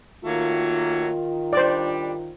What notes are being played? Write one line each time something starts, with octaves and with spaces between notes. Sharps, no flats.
D#3 F#3 A3 A#3 F4
G3 D4 C5 D5